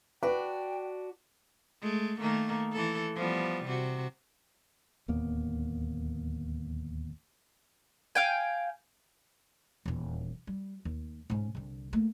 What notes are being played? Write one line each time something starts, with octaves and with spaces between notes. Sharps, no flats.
D4 F#4 B4 D5 G5
G#3 A3
D#3 A3 A#3
E3 A4
F3 G3 B3
C3 F#4
D1 D#2 A#3 B3
F5 G5 G#5
D#1 E2
G3
D#2
G#2 C#4
C2 D3
A3 A#3